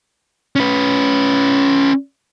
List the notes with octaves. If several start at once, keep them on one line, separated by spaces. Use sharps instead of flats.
C#4 B4